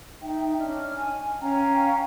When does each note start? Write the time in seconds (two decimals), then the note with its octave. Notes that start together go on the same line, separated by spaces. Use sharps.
0.22 D#4 E5 G5
0.58 C#4 D4 D#5 F6
0.95 G#5
1.40 C#4 F5 G5 A#5